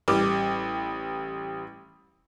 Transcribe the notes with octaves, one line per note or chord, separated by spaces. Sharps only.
A1 G3 D6